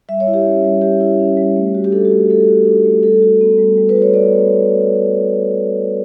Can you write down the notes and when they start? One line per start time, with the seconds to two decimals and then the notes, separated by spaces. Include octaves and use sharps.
0.09 G3 E5
0.20 C#5
0.27 E4
0.34 G4
0.45 C#4
0.64 G3
0.82 G3 G4
1.01 E4
1.19 C#4
1.37 G3
1.56 A3
1.74 F#4
1.84 G4
1.92 D4 A4
2.05 F#4
2.11 A3
2.30 A3 A4
2.48 F#4
2.66 D4
2.84 A3
3.03 G3 A4
3.22 F#4
3.41 B3
3.59 G3
3.77 G3
3.89 B4
3.96 F#4
4.02 C#5
4.14 B3 D5